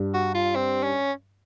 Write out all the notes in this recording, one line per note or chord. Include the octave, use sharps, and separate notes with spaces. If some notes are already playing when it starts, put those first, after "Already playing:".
Already playing: G2
F#4
F4
C4
C#4